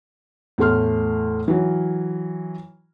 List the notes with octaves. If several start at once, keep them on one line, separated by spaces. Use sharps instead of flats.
E2 A2 A3 C6 F6
E3 F#3